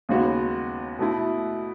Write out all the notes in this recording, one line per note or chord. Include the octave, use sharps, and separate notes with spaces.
D#2 C#3 G#3 B3 F#4
B2 A3 E4